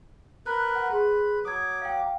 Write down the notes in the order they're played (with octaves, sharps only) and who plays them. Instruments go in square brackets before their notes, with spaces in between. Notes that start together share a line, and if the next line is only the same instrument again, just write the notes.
[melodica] A#4 B4 [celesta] F#6
[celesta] F#5
[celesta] G#4 C6 [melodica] B4
[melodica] F#3 D6 [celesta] D#6 G#6
[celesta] F5 G5